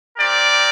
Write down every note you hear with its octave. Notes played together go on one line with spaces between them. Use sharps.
C4 G4 A#4 D5